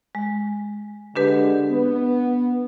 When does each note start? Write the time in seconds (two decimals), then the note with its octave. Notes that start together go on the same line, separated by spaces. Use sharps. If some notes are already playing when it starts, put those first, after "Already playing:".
0.15 G#3
1.16 D3 G#3 D4 G4 B4
1.70 B3